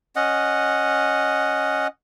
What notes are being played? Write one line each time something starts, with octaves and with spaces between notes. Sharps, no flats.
C#4 D#5 F#5